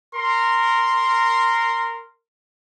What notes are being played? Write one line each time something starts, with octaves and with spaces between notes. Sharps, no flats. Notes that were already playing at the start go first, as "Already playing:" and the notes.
A#4 C6